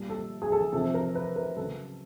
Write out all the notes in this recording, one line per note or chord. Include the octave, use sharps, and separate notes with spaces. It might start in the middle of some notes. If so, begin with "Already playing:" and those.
Already playing: A#2 G3
A4
G#4
A4
C3 F3 A4
A#4
B4
A#4
C#3 F#3 A4